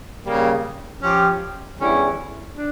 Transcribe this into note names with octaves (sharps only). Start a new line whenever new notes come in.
C#3 G3 A#3
F3 C#4 G4
E2 D3 G3 C#4 E4
D4